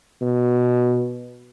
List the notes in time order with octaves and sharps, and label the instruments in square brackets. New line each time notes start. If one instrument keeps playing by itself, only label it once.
[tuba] B2